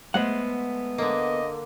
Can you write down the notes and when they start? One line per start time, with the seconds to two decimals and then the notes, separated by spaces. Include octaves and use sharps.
0.14 G#3 A3 B3 C5 F#5
0.98 D3 A#3 D#5